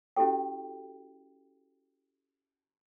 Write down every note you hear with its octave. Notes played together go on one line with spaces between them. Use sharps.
C#4 E4 F#4 G4 A4 G5